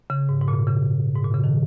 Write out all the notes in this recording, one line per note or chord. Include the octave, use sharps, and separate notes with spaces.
C#3
G#2
G#2
A#2
C#3
G#2
A#2
C#3
D#3